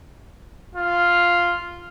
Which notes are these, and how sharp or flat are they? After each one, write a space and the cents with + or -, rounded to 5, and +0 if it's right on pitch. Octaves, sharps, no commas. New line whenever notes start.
F4 +0